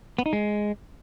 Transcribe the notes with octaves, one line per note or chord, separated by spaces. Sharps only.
B3
D#4
G#3